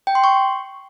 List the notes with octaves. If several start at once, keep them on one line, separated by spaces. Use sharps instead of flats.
G5
C6
C#6